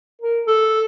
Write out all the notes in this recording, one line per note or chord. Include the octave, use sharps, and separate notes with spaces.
A#4
A4